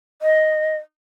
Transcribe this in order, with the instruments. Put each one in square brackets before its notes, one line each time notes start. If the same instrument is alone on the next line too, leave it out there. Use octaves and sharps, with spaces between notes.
[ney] D#5